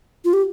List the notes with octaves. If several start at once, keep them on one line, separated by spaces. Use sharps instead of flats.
F4
G4